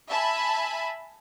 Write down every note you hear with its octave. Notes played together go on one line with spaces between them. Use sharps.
E5 G#5 A5 B5